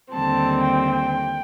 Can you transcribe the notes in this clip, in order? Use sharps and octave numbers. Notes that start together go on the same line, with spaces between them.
D#2 D3 G3 C4 A5
G5